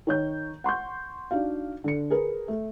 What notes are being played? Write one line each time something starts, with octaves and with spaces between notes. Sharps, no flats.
D#3 C#5 G6
F#5 C6 C#6 G6
D4 D#4 F#4 F5
D3 A4 C#7
G#4 A#4 B4
A3